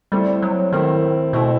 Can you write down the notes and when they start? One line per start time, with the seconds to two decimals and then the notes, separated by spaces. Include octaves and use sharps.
0.12 G3 A3 C4 E4
0.42 F#3
0.72 D#3 A3 C4 E4
1.33 B2 A3 C4 E4